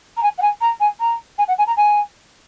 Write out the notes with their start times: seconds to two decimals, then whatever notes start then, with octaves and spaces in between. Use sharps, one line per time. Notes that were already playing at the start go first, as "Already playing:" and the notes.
0.17 A#5
0.23 G#5
0.38 F#5
0.42 G#5
0.61 A#5
0.80 G#5
1.00 A#5
1.38 G#5
1.48 F#5
1.58 G#5
1.67 A#5
1.77 G#5